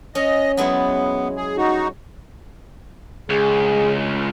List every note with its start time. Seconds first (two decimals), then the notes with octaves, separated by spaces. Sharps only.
0.15 C#4 D#5
0.57 F#3 G#3 B3 E4
1.36 G#4
1.57 D#4 F#4
3.30 C#2 G#4